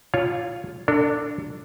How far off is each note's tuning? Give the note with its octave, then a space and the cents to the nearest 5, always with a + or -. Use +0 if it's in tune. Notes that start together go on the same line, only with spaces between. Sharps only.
F4 +0 C#5 +0
D4 +0 A4 +35